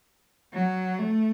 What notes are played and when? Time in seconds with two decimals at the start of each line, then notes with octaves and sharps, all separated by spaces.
0.54 F#3
0.99 A3